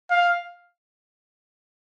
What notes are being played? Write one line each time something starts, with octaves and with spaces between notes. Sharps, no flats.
F5